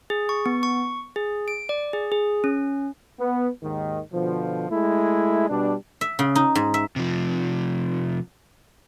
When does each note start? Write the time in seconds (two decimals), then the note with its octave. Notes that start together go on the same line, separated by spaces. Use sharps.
0.10 G#4
0.29 C#6
0.46 B3
0.63 C#6
1.16 G#4
1.48 D7
1.69 D5
1.93 G#4
2.12 G#4
2.44 C#4
3.20 B3
3.63 D#2 G#2 D#3
4.13 B2 D3 F3
4.71 G#3 A3 E4
5.49 B2 G3 D4
6.01 E5
6.19 C#3
6.35 D#4
6.55 G#2
6.74 E5
6.96 C3 F3